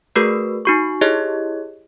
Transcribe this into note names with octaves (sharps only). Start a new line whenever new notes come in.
A3 F#4 G#4 A#4 B4
D#4 F#4 C#6
E4 G4 G#4 C#5 D#5